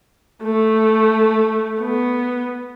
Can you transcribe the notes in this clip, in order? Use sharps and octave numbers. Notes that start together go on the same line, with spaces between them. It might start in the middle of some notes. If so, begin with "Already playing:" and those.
A3
B3